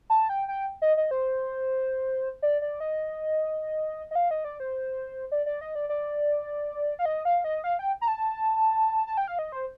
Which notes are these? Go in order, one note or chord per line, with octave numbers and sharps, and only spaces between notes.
A5
G5
G5
D#5
D#5
C5
D5
D5
D#5
D#5
F5
D#5
D5
C5
D5
D5
D#5
D5
D5
F5
D#5
F5
D#5
F5
G5
A#5
A5
A5
G5
F5
D#5
C5